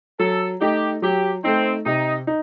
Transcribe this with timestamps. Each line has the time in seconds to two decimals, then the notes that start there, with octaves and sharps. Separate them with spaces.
0.19 F#3 A4
0.61 A3 D#4 G4
1.02 F#3 G4
1.44 A3 C4 D#4
1.85 C3 D#4
2.27 D#4